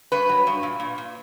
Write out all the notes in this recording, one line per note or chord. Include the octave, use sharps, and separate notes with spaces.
G2 B4
F#3
G2
A#2
A#2
A#2